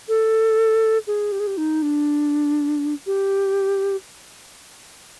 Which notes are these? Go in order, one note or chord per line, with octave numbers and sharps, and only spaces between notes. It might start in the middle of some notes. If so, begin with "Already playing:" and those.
A4
G#4
G4
G#4
G4
D#4
D4
G4